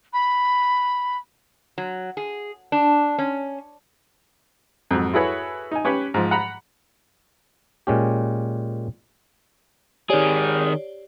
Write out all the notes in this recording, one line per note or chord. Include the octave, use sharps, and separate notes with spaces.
B5
F#3
G#4
D4
C#4
F2 G#2 F#3
E4 F#4 G#4 A4 B4 C#5
D#4 G#5
C#4 G4 B4 C#5
G#2 F3
F#5 A#5 B5
A#2 G#3 C#4 G4
D#3 G4 G#4 C#5 D5